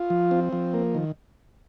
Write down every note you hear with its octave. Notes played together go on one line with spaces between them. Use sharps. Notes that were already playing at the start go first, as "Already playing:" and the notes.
Already playing: F4
F3
C4
F3
A#3
D#3